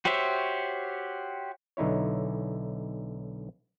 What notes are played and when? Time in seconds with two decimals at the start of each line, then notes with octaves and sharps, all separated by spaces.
0.05 F#4 G4 C5 C#5 E5
1.77 B1 D3 D#4 E4 C#5